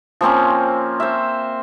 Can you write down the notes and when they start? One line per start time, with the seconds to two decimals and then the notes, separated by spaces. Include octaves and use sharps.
0.21 F3 A#3 C4 C#4
1.00 C5 E5